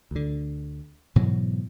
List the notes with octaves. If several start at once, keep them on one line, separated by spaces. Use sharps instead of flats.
D2 D3
G#2 B2 E3 F#3